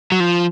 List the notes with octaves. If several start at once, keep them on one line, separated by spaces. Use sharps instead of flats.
F#3
F3